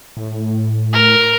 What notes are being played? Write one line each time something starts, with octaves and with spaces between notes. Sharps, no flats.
A2
A#4